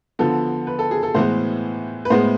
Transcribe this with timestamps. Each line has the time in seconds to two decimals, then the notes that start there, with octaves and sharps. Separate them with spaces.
0.19 D3 F3 B3 A4
0.67 B4
0.79 A4
0.91 G#4
1.03 A4
1.14 A2 E3 G#3 B3 C5
2.05 B4
2.10 A2 G#3 B3 C5